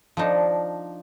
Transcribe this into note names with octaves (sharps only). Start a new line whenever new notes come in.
F3 D4 D#4